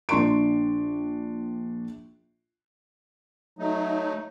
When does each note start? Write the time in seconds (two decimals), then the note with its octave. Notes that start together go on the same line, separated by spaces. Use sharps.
0.09 A#1 D4 C6 C#6 D7
3.59 F#3 A3 D#4